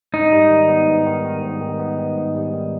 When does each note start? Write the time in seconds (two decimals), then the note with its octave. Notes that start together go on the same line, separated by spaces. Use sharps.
0.13 G#2 D#4
0.32 G3
0.50 D#3
0.69 B3
0.87 G#2
1.06 D#3
1.24 D#3
1.42 G#2
1.61 D#3
1.80 B3
1.98 D#3
2.16 G#2
2.35 G3
2.54 D#3